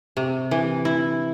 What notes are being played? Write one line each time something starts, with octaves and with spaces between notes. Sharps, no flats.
C3
E3
E4